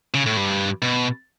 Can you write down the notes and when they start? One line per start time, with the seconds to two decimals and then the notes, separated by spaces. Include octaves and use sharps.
0.14 C#3
0.26 A2
0.37 G2
0.82 B2